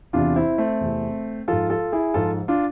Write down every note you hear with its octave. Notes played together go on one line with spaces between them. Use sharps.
E2 C3 E3 D4 F4
C4 E4
A3 C4
E2 C3 E3
G#2 F3 F4 A4
F4 A4
E4 G#4
G#2 F3 F4 A4
D4 F4